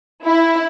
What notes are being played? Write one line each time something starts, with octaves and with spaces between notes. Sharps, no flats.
E4